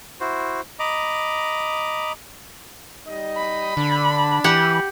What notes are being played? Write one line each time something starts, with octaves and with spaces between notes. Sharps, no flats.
E4 F#4 C5
D#5 A#5 B5 D6
G3 D#4 D#5
B5
D3 D4
E3 G4 F#5